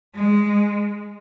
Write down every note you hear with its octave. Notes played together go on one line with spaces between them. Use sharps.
G#3